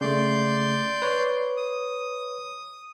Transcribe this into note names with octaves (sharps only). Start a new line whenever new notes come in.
C#3 A3 D5 C6 G6
B4 C#5
D#6